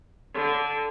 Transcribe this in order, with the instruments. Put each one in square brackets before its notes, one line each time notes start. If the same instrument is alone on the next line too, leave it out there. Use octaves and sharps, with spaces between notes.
[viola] D3